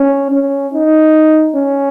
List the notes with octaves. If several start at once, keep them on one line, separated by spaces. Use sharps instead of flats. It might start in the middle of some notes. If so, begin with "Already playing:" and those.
Already playing: C#4
C#4
D#4
C#4